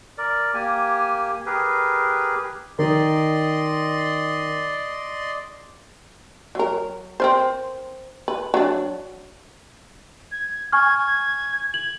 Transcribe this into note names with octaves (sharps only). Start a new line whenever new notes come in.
A#4 D5
A#3 G4 G#5
G4 G#4 A#4 B4
D#3 D5 D#5 C6
F#3 A#4
C4 A#4 C5
B4
F#3 D4
G#6
G#5 C#6 F6 G#6
G#6
G#6 F#7